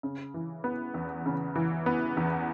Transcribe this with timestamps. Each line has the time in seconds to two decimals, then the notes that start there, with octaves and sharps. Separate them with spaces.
0.03 C#3
0.34 E3
0.64 B3
0.94 E2
1.26 C#3
1.56 E3
1.86 B3
2.17 E2